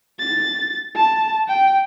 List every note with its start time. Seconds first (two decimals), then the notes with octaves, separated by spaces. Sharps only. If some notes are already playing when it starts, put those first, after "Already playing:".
0.20 A6
0.95 A5
1.48 G5